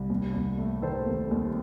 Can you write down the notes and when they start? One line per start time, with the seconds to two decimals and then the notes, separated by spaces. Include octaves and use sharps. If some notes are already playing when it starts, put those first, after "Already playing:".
Already playing: C2
0.10 D#2
0.34 D#2
0.59 A3
0.82 D#3 A4 C5
1.06 D#2
1.31 D#2